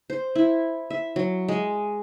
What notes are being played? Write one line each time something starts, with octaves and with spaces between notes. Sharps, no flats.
C5
E4
E5
F#3
G#3